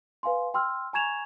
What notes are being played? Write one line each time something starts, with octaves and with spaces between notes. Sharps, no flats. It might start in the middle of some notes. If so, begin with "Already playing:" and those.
B4 F5 G#5 C6
G5 C6 E6 F6
G#5 A#5 C#6 G#6 E7 F7